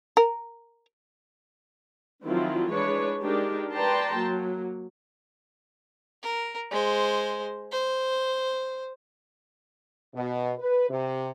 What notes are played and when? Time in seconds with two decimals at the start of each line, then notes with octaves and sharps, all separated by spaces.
0.17 A#4
2.24 D#3 F3 F#3 C4 E4 F4
2.70 E3 G#3 D4 B4 C#5
3.23 G#3 D4 D#4 G4 A#4
3.73 B4 D5 G5 A5 A#5 C6
4.16 F#3 A#3
6.23 A#4
6.72 G#3 C5
7.72 C5
10.14 B2
10.58 B4
10.89 C3